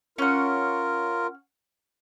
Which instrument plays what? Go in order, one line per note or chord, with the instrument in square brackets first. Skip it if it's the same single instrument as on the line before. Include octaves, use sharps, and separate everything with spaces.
[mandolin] C#4 F#5 [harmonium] F4 A#4